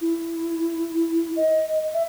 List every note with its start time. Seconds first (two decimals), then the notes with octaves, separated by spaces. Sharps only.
0.01 E4
1.36 D#5
1.94 E5